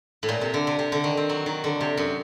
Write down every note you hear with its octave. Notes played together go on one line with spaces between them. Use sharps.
A2
A#2
C3
D3
C3
C3
D3
D#3
C4
F#3
D#3
D3
C3
F#2